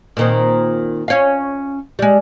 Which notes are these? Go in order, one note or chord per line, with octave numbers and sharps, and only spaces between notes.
A#2 D#3 C4
C#4 C#5 F5
G3 G#3